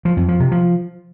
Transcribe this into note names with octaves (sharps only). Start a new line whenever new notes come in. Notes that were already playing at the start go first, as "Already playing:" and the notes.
F3
F2
F3
C3
F3